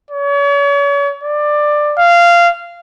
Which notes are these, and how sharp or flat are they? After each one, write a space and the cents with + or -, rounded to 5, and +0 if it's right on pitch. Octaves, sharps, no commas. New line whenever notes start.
C#5 +40
D5 +15
F5 -15